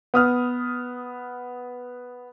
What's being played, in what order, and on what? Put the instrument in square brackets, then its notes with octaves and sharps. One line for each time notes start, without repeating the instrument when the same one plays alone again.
[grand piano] B3 D#6 F6